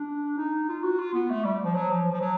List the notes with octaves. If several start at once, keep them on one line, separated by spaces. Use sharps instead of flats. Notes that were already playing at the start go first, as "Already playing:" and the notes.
Already playing: D4
D#4
F4
F#4
F4
B3
A3
G3
F3
F#3
F3
F3
F#3